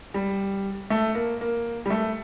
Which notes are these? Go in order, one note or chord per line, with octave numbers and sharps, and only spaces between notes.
G3
A3
A#3
A#3
G3
A3